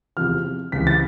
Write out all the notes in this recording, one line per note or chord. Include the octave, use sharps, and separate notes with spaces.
E2 C3 F3 F6
C#2 C3 E3 B6
A6